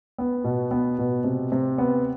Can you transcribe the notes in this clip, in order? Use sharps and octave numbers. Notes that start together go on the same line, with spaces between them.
B3
B2
B3
B2
C3
C3
B3